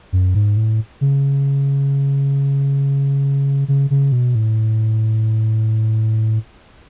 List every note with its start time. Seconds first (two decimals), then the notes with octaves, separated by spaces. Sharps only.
0.13 F#2
0.34 G#2
0.57 A2
1.01 C#3
3.68 C#3
3.90 C#3
4.12 B2
4.35 A2